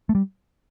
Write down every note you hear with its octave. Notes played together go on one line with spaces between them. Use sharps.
A3
G3